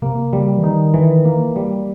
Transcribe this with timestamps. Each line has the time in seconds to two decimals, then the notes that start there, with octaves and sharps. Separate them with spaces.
0.02 C3 A#3
0.32 C#3 G3
0.58 E3
0.64 D#3 D#4
0.94 E3
1.25 A#3
1.56 G3